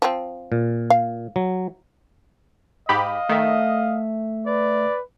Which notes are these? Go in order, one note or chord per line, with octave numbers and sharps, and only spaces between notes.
F3 C4
A#2
F5
F#3
G#2 G4 D#5 F5 B5
D#3 A3 E5
B4 D5